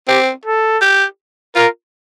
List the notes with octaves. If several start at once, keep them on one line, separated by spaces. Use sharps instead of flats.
C4 G4
A4
G4
F4 A#4